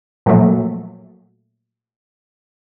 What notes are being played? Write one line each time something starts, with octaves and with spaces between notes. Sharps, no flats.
A#2 F3 F#3 A3